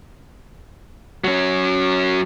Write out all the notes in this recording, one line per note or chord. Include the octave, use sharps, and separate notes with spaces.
F#3 C#4